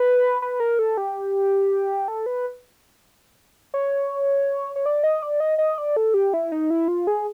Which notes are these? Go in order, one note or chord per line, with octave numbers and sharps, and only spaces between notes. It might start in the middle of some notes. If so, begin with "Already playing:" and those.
Already playing: B4
B4
A#4
A4
G4
A4
B4
C#5
C#5
D5
D#5
D5
D#5
D#5
D5
A4
G4
E4
D#4
E4
F4
G#4